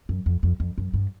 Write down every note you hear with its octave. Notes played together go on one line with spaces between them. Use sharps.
F#2
F2
F2
F2
F#2
G2